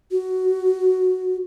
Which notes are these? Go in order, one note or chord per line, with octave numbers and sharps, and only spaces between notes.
F#4